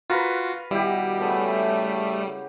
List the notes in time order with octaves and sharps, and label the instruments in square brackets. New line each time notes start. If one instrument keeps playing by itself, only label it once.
[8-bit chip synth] F4 F#4 [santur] A#4 B4
[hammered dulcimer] B2 D#3 [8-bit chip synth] G3 [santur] E4 G4
[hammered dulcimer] C#3 B3 [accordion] A3